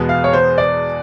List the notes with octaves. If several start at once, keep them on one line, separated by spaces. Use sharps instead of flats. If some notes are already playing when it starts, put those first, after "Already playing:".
Already playing: E2 B2 G#3 B3
F5
C#5
C5
D5